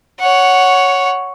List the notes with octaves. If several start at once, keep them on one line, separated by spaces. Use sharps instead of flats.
C#5 F#5